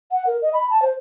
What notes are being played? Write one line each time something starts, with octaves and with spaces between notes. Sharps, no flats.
F#5
A#4
D#5
B5
A5
C5